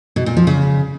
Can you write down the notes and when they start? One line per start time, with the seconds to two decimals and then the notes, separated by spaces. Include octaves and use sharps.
0.16 B2
0.26 A#2
0.37 F3
0.47 C#3